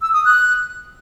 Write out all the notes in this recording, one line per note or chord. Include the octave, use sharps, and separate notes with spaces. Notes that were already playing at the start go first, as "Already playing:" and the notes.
E6
D#6
F#6